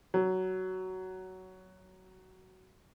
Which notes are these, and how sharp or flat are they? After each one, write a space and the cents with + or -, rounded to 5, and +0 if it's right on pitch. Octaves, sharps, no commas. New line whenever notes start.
F#3 +15